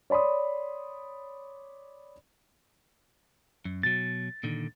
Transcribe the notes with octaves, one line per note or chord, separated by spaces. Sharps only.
C#5 D5 B5 C6 D#6
F#2
B2 F#3 A6
A#2 D3 D#3